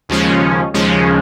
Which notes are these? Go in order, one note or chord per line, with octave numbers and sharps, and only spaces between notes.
D#2 C#3 F3 G#3 C#4
D#2 C#3 F3 G#3 C#4